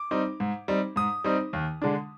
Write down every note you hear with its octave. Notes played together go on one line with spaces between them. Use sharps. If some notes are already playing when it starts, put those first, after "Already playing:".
Already playing: D6
G3 C4 D#4
G#2
G3 C4 D#4
G#2 D#6
G3 C4 D#4
D#2
D3 G#3 D4